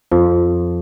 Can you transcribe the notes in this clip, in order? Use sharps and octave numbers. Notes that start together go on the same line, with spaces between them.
F2 F3